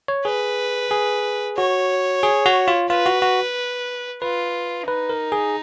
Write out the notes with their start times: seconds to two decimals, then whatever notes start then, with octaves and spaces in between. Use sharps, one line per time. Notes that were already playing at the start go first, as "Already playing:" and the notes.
0.08 C#5
0.25 G#4 B4
0.91 G#4
1.57 F#4 C#5
2.23 G#4
2.46 F#4
2.68 F4
2.90 F4 B4
3.06 F#4
3.22 F#4
4.22 F4 B4
4.88 D#4 B4
5.09 A#4
5.32 G#4